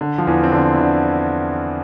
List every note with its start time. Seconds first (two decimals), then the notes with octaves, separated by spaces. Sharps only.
0.01 D3
0.18 F3
0.27 E2 E3
0.43 C4
0.52 D3 D4
0.74 E4
0.79 D3 D4